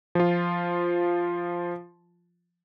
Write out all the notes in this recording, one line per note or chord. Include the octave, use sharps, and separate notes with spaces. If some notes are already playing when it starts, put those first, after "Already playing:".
F3 F4